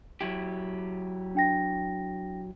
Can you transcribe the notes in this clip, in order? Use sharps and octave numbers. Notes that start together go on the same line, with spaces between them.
F#3 E4 G4
D4 G5 A#6